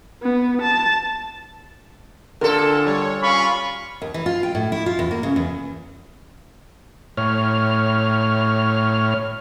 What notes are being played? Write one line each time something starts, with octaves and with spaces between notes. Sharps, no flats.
B3
A5
A#2 D3 A4 A#4
G3 C#5
C#4 F4 F5 B5 C#6
D#2
E3
F4
G5
A2
E4
F4
E2
A#3
C#3
E2
A2 C#5 F6